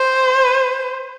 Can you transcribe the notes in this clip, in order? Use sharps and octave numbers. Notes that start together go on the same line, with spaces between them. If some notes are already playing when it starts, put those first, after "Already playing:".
Already playing: C5